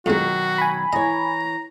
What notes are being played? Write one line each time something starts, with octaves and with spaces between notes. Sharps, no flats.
F2 B2 D#3 F#3 G#3 F#4
G#5 B5
E3 C#5 D#5 A#5